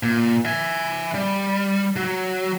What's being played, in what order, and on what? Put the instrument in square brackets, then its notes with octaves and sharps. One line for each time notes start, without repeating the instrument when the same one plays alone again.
[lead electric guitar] A#2
E5 G#5
G3
F#3